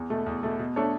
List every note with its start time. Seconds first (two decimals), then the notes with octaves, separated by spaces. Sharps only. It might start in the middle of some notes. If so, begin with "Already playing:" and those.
Already playing: E2
0.10 B2 A3
0.26 E2
0.43 B2 A3
0.59 B2
0.76 A3 D4 A4 C#5